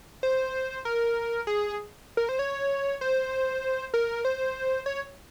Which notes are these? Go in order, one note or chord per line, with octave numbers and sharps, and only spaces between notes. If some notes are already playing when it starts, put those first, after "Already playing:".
C5
A#4
G#4
A#4
C5
C#5
C5
A#4
C5
C#5